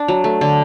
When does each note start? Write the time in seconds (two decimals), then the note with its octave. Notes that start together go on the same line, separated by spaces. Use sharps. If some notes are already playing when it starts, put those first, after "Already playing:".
Already playing: D4
0.08 F#3
0.24 A3
0.41 D3